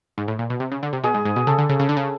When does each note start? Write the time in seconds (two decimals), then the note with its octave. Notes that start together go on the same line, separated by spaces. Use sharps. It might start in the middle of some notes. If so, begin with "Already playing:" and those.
0.18 G#2
0.28 A2
0.39 A#2
0.50 B2
0.60 C3
0.72 C#3
0.83 D3
0.93 C3
1.04 B2 G#4
1.14 G#2
1.25 G#2
1.36 B2
1.47 C#3 A4
1.58 D3
1.69 C#3
1.80 C#3
1.89 D3
1.97 C#3